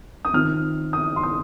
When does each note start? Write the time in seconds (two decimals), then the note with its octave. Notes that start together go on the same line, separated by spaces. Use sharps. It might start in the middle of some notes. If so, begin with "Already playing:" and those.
0.25 D#6
0.33 D#3 C4 F4 F6
0.93 D#6
1.16 C6
1.23 D#6